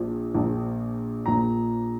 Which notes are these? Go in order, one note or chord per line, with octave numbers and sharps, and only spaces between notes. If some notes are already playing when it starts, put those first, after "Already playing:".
Already playing: A#1 A#2 F3
A#1 A#2 F3
A#1 A#2 F3 A#5